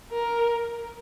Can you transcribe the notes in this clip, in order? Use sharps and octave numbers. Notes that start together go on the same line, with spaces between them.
A#4